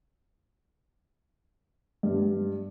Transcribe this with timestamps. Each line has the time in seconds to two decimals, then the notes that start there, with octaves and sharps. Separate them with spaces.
2.03 G2